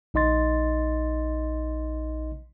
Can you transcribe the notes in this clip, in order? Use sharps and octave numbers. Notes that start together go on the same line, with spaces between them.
A#1 D#4 D#5 C6 A6